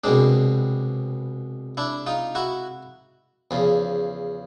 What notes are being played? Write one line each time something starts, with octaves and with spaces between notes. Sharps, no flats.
C2 B2 G#3 C4 D4
D4 E4
D#4 F4
E4 F#4
E2 C#3 F3